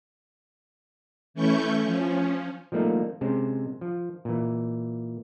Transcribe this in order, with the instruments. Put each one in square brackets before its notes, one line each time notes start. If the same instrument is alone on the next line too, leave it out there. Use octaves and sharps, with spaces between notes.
[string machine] E3 A3 C#4 E4 C#6 G6
F3 C#4
[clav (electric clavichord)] F3 G3 A3 A#3 D#4
C3 G#3 C#4 C5
F3
A#2 E3